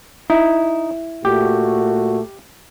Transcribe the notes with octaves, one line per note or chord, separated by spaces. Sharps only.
D#4 E4
A#2 A3 F#4 G4